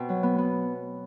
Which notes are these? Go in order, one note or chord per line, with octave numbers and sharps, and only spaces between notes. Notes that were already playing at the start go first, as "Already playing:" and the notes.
Already playing: B2 C4
F#3
B3
B3